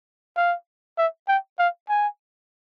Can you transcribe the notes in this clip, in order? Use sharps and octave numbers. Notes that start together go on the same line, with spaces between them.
F5
E5
G5
F5
G#5